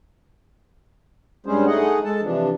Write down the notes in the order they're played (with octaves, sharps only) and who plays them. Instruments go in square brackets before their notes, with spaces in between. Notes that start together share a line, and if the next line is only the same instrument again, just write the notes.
[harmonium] G2 G3 G#3 C#4 G#4 C5
A3 D#4 G#4 D#5 F#5
G#3 A4 A5
C3 E3 F3 D4